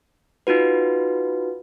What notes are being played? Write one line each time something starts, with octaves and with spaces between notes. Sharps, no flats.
D#4 F4 F#4 B4